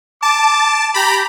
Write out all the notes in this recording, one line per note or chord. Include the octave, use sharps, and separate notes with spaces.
A5 D6
G4 A#5 B5